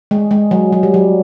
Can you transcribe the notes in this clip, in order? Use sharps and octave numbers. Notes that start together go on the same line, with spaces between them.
G#3
G#3
F#3
F#3
G3
F#3